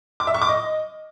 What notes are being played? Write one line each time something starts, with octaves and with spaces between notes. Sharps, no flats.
D6
E5
C#6
D6
D#5